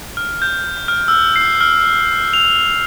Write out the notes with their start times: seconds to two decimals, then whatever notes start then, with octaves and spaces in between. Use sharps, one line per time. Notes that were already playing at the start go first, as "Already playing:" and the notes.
0.17 F6
0.42 G6
0.88 F6
1.08 E6
1.36 C7
1.61 F6
2.33 F7